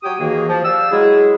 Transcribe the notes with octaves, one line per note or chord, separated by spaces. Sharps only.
F#3 G4 C#5 G5 D#6
D#2 D#3 E3 A#3 F#4 G#4
F3
G4 D5 F5 E6
F#3 G#3 E4 G#4